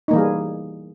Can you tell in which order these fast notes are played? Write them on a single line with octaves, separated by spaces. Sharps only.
D#4 A#3 E3 G3 G#4